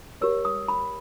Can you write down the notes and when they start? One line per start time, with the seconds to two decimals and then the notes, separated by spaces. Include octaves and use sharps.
0.21 G4 A#4 C#5 E6
0.45 D#6
0.68 B5